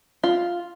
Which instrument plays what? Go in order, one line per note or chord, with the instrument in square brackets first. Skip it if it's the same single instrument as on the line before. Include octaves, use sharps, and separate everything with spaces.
[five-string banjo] F4